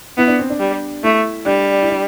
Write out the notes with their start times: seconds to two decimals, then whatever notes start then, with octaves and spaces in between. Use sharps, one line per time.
0.17 B3 E4
0.28 D4
0.39 C4
0.50 D4
0.60 G3
1.03 A3 E4
1.46 G3 D4
1.82 E4
1.90 D4